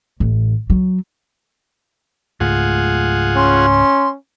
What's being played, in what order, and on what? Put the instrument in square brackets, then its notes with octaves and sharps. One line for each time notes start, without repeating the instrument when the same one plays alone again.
[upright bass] A1
F#3
[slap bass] C#2 G#2 A3 [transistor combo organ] F4 G#4 F#5
[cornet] C#4 [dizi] C6